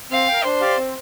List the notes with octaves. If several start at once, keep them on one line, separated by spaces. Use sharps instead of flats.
C4 F5
A#4 G5
D4 C5
G4 D5 F5
C4